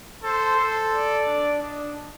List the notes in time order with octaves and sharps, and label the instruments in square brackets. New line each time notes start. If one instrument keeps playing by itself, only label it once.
[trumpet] A4 [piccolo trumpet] C5
[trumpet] A4
[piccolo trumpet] D5
[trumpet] D4
[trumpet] D4 [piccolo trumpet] D#5